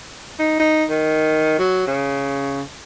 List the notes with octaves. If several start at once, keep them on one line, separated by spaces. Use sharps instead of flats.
D#4
D#4
D#3
F#3
C#3